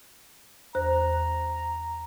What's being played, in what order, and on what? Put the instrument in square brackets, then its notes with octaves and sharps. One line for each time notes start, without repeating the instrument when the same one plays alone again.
[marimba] E2 C5 F#6 [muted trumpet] A#5